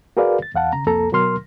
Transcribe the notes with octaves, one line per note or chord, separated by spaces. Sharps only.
F#4 G#4 A#4 B4 D5 F5
A6
E2 F5 F#5 A5
C#3 A#5
C2 F2 A#3 A4 A#5
B2 F#3 A#4 C6 F6